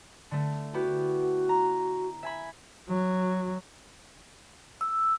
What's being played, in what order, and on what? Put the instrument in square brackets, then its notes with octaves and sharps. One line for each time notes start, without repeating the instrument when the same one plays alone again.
[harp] D3 A3
[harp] B3 E4 G4 [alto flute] F#4
[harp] A#5
E5 G#5 B5
[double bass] F#3
[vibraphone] E6